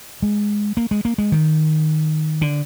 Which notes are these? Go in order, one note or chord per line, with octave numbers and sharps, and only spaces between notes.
G#3
A#3
G#3
A#3
G#3
D#3
D3